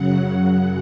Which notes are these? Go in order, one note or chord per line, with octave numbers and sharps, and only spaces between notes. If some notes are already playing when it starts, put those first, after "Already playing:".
Already playing: F#2 C#3 F#3 F#5